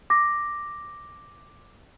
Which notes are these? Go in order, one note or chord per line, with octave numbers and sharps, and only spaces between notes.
D6 A#6